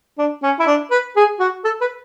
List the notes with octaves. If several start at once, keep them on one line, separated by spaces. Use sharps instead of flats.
D4
C#4
E4
D4
B4
G#4
F#4
A4
B4